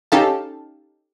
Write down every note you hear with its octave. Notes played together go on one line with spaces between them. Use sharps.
C#4 D#4 G4 A4 F5 A5